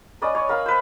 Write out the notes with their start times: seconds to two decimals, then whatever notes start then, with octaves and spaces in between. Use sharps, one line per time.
0.22 C#4 B4 D5 D#5
0.35 C#5
0.49 A#4 F5 B5
0.66 B4 C5